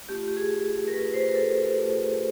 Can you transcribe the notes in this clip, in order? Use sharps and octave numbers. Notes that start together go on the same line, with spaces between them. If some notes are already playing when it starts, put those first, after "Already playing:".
A3 C#4 F4 G4
G4
G#4
A#4
A3 C#4 F4 B4
C5
B4
A#4
A4
A3 C#4 F4